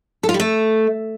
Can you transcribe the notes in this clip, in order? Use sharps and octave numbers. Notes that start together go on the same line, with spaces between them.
A4
F4
G3
A3